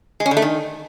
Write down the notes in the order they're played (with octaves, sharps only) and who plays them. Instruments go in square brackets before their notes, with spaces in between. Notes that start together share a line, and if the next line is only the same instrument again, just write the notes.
[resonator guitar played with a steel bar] G#3
C#4
D3
A3
D#3